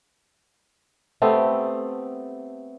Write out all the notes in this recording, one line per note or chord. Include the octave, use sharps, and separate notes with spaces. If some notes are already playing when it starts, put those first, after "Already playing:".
A3 B3 C4 G4